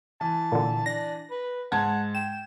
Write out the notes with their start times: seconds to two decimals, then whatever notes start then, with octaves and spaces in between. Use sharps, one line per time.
0.21 E3 A5
0.52 A#2 D3
0.86 D4 A#6
1.31 B4
1.72 G#2 F#5 A5 G#6
2.15 G5 E7